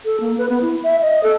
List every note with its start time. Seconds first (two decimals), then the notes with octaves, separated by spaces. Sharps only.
0.05 A4
0.20 A#3
0.38 B4
0.49 B3
0.61 E4
0.84 E5
1.02 D#5
1.23 A4